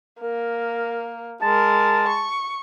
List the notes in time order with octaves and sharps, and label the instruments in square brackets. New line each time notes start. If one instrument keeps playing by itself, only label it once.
[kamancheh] A#3 [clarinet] A#4
[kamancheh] G#3 A#4 [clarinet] A5
[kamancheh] C#6